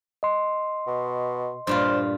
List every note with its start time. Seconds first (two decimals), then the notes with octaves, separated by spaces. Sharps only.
0.23 D#5 C6
0.87 B2
1.67 G2 A#2 F4 C5